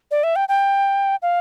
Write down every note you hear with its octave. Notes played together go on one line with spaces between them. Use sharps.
D5
E5
G5
G5
F5